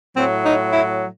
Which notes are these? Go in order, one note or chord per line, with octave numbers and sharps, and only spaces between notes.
A2 F#3 C4
D#4
E4